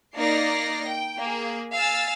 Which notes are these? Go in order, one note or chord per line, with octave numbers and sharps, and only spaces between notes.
A#3 D#4 D5 A#6 C7
G5
A#3 G#4
F5 G#5 E6 A6